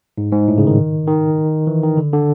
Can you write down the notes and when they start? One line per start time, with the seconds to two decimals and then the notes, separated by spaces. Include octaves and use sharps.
0.18 G#2
0.32 G#2
0.48 A2
0.58 C#3
0.67 D#3
1.07 D#3
1.67 E3
1.83 D#3
1.97 D3
2.13 D3